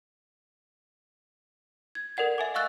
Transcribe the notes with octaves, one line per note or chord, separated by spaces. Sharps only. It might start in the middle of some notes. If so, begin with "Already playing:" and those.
G#6
A4 A#4 D5 F#5 G#6
E5 G#5 D6
D#5 F5 C#6 E6 F#6 A6